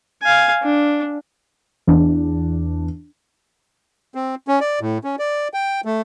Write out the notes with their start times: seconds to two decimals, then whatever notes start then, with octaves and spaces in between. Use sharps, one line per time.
0.23 F5 G#5
0.63 D4
1.87 E2 D4
4.15 C4
4.48 C#4
4.61 D5
4.81 A2
5.04 C#4
5.19 D5
5.54 G5
5.85 A3